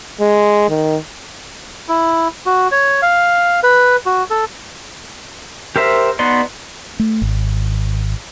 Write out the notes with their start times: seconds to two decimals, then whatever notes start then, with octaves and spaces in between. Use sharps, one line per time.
0.21 G#3
0.69 D#3
1.88 E4
2.46 F#4
2.72 C#5
3.02 F5
3.63 B4
4.06 F#4
4.30 A4
5.76 G4 A#4 C5 E5
6.19 B3 D#4 F#4 D5 C6
6.99 A3
7.22 G#1